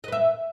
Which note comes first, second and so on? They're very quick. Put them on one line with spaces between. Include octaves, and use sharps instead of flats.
D#5 B4 E5